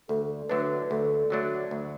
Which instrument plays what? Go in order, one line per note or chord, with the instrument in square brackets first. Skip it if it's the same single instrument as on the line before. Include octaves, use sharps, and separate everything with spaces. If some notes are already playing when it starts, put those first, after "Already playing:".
[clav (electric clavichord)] D2 [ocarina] A4
[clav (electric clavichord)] D3 F#3 A3 D4 [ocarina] B4
[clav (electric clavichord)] D2 [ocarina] A4
[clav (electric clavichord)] D3 F#3 A3 D4
D2